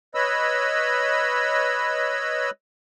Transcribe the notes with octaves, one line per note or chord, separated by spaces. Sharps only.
B4 C#5 D#5 B5 E6